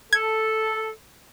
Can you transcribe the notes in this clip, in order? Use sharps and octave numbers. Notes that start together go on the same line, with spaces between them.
A4 G#6